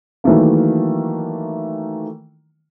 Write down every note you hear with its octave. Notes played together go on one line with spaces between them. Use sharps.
D#3 E3 F#3 A3 A#3